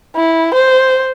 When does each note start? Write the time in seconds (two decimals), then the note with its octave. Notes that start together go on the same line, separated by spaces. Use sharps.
0.16 E4
0.54 C5